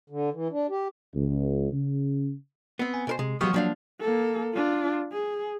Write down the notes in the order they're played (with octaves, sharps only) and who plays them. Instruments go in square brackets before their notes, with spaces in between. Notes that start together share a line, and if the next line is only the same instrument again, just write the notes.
[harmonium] D3
E3
D4
G4
[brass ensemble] C#2
C#3
[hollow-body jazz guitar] B3 C4
[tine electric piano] G#5
[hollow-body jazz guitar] B2 A#4 C5
[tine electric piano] C3 [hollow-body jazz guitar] G#3
[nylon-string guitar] F3 F#3 [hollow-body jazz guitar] G#3 B3 G4 [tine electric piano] C#6 D#6 F6
[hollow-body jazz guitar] F3 D4 F5 [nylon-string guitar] F#3 [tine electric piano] A#3
[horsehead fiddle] A#3 A4
D4 F4
G#4